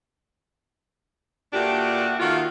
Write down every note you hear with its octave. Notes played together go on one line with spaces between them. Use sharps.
A#2 A3 D4 F#4 G4
D#3 A3 A#3 F4 F#4